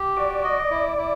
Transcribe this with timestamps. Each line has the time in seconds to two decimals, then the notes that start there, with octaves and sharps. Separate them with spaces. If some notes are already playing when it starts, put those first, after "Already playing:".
Already playing: G4
0.17 F#4 D5
0.44 D#5
0.71 E4
0.98 E4